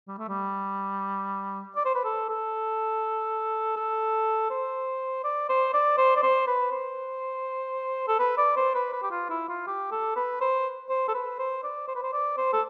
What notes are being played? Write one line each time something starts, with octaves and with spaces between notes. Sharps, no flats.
G3
A3
G3
D5
C5
B4
A4
A4
A4
C5
D5
C5
D5
C5
D5
C5
B4
C5
A4
B4
D5
C5
B4
B4
G4
F4
E4
F4
G4
A4
B4
C5
C5
A4
B4
C5
D5
C5
B4
C5
D5
C5
A4